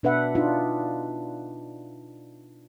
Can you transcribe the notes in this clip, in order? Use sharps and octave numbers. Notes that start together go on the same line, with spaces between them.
B2 D4 B4 E5 F#5
D4 D#4 F4